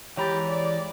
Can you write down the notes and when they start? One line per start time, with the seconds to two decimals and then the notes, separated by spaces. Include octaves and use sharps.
0.17 E3 G#3 G4 C#5 A#5 B5 A6
0.49 D5